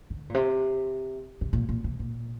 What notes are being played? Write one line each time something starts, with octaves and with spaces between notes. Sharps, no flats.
D3
A#2
C3
C3
A#2
A#2
C3
A#2